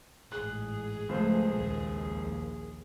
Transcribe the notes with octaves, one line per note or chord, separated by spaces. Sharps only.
A1 G#2 G#4 F#6
C#2 F3 A3 C5
A#1 D#2